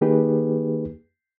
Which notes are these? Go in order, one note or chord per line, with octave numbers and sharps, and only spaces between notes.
D#3 A#3 D#4 G4 G#4 B4